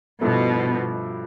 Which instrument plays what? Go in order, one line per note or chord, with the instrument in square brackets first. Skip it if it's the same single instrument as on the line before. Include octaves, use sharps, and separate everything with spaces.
[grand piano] G2 F3 A3 E4 A4 [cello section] B2